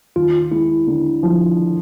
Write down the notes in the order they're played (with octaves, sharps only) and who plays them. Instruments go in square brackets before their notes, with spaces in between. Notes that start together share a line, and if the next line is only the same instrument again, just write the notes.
[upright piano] D#2 [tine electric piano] F4
[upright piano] G#3 [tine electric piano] E4
[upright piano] D3
F3